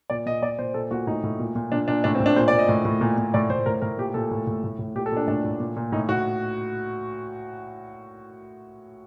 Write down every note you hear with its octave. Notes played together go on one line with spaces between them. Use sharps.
A#2 D5
A#2 D#5
A#2 D5
A#2 C5
A#2 A4
A#2 F#4
A2 D#4
A2
A#2
A#2
A#2 D4
A#2 D4
A2 D4
C4
A2
D4
A#2 C5
D5
A#2
D#5
A2
A2
A#2
A#2
A2 D5
A2 C5
A2 A#4
A2 A#4
A#2 G4
A#2 A4
A2
A2
A2
A2
A#2 G4
A4
A#2 D4
A2 D4
A2
A#2
A#2
A2 D#4
A2 F#4